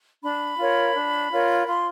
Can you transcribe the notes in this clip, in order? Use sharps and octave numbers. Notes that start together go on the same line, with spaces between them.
D4 B5
F4 A#4 C#5
D4
F4 A#4 C#5
F4 C6